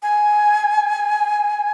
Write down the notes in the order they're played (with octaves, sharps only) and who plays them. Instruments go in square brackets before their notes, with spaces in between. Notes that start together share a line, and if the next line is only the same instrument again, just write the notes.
[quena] G#5